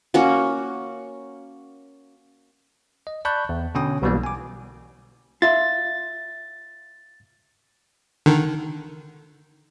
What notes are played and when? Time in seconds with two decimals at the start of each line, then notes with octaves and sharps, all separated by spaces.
0.14 A#3 C#4 F#4
3.07 D#5
3.25 D5 A5 B5 C#6 F#6 G6
3.49 E2
3.75 B2 D3 C#4 C#5 G5 D#6
4.02 B1 B2 E3 G3 A#3
4.24 G#5 D6
5.42 F4 E5 A6
8.26 D3 D#3